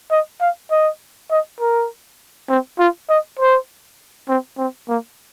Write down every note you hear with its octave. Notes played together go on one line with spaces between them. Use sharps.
D#5
F5
D#5
D#5
A#4
C4
F4
D#5
C5
C4
C4
A#3